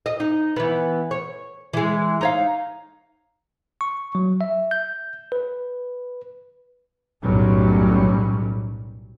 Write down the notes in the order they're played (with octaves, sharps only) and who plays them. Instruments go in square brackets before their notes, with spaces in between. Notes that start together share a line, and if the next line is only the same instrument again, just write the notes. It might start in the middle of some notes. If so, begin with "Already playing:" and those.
[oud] D#5
D#4
E3 B3
C#5
E3 G#3
D#4 C#5 F5
[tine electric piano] C#6
F#3
E5
G6
B4
[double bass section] B1 F#2 A2 F#3 G3 C#4